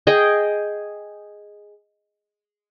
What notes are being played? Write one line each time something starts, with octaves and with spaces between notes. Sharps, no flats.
G#4 D#5 G5